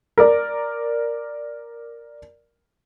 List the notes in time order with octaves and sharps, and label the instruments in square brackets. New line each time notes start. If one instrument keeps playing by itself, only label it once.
[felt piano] A#4 D5